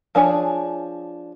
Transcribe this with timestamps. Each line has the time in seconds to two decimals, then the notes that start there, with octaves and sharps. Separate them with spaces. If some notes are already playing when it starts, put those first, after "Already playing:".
0.15 F3 D4 G#4 C#5